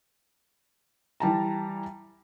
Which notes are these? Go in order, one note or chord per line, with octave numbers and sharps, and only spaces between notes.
E3 G3 A5 A#5